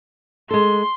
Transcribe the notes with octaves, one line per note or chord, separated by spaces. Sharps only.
G#3 A4 C6